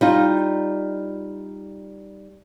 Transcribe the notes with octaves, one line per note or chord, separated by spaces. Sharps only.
G3 D#4 F4